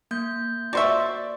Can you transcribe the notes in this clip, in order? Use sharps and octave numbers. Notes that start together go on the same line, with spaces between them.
A#3 G6
F#4 C5 D5 E5 C6 C#6